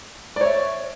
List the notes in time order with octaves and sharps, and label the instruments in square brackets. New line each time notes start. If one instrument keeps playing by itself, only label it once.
[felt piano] D5
C#5
E5